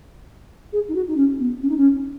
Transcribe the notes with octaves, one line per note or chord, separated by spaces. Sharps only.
G#4
D#4
F#4
D#4
C#4
B3
C#4
D#4
C#4